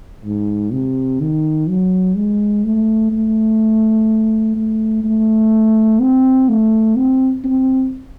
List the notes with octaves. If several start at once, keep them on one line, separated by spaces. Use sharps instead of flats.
G#2
C3
D#3
F#3
G#3
A3
A3
A3
A3
C4
A3
C4
C4